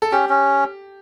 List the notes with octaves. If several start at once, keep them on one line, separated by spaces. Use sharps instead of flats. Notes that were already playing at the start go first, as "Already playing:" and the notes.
A4
C#4 G4
C#4